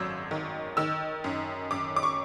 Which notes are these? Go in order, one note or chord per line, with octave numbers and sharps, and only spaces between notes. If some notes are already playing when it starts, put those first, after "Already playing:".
Already playing: G#1 F#2 F#3 E6
D#3
D#3 E6
F#2
F#2 D6
D6
C#6